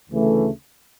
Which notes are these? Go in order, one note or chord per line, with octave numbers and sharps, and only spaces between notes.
D2 C#3 E3 A3